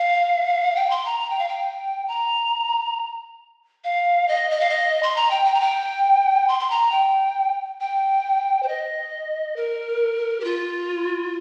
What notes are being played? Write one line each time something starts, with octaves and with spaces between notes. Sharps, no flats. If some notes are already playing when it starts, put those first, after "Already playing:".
Already playing: F5
G5
C6
A#5
A#5
G5
F5
G5
A#5
F5
D#5
D#5
F5
D#5
C6
A#5
G5
G5
A#5
G5
C6
C6
A#5
G5
G5
C5
D#5
A#4
G4
F4